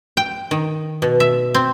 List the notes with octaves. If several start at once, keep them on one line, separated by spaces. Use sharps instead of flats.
G5
D#3
B2
E5
C4